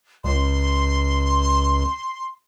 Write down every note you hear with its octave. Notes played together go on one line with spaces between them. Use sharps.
C#2 C6